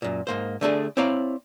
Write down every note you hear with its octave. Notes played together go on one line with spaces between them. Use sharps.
F#2 A#2
G#2 A#3 C5
D3 A3 D4 G#4
C4 E4 C#5 D5 F5 A#5